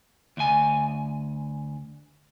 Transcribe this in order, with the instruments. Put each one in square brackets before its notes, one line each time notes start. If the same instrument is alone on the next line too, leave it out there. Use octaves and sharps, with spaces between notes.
[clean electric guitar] D2 G#5